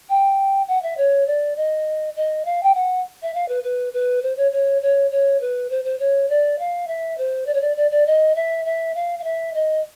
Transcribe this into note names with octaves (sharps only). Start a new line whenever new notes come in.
G5
F#5
E5
C#5
D5
D#5
D#5
F5
G5
F#5
E5
F5
B4
B4
B4
C5
C#5
C#5
C#5
C#5
B4
C5
C5
C#5
D5
F5
E5
C5
D5
C#5
D5
D5
D5
D#5
E5
E5
F5
F5
E5
D#5